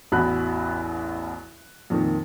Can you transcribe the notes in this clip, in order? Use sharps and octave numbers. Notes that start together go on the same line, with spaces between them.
A1 E2 F#4 B5 F#6
F2 A#2 D#3